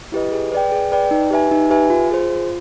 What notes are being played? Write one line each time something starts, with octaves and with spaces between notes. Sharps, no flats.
E4 G4 B4 D#5
G#4
B4 D5 G5
G#4
B4 D5 G5
D#4
G4 B4 E5 G#5
D#4
G4 B4 E5 G#5
F4
G#4 C5
F4